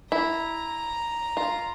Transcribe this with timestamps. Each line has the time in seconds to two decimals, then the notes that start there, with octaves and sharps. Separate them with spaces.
0.12 E4 A#5
1.37 F4